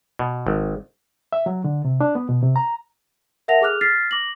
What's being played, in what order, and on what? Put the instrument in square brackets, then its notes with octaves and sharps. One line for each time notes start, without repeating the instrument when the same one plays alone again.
[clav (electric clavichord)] B2
G#1
[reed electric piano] E5
F#3
D3
C3
D4
B3
B2
C3
A#5
[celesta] A#4 E5 F#5 A5 A#6 F7
G#4 A4 D6 F6 F#6 F7
F6 A6 B6 C7
D6 A#6 F#7